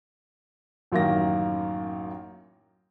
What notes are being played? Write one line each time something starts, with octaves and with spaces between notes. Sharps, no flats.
A1 F#2 D#3 A#3 A#6